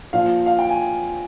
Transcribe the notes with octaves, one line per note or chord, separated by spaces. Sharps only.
A#2 F3 F5
F5
G5
G#5